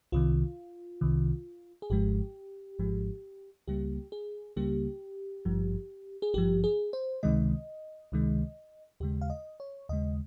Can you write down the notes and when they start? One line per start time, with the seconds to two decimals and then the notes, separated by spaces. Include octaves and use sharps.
0.12 C2 C3 D#3 F4
1.01 C2 C3 D#3
1.82 G#4
1.90 G#1 G#2 F3 G#3 G4
2.79 G#1 G#2 F3 G#3
3.68 C#2 C#3 G3 A#3 G4
4.12 G#4
4.56 C#2 C#3 G3 A#3 G4
5.45 G#1 G2 F3
6.22 G#4
6.34 G#1 G2 F3 G4
6.64 G#4
6.93 C5
7.23 C#2 C3 D#3 G#3 D#5
8.12 C#2 C3 D#3 G#3
9.00 D#2 C#3 G#3 G4
9.21 F5
9.30 D#5
9.60 C#5
9.89 D#2 C#3 G#3 D#5